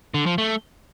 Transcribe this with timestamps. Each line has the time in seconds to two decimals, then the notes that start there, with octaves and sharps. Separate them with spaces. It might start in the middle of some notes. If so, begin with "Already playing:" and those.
0.14 D3
0.26 F3
0.38 A3